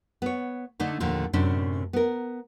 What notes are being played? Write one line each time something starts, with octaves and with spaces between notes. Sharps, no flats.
B3 C#5
D3 A3 D4 D#4
D#2 A2 D3 F3
F#2 A2 C3 C#4 D4
B3 A#4